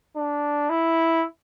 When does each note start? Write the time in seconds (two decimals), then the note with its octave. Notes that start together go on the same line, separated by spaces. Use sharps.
0.16 D4
0.70 E4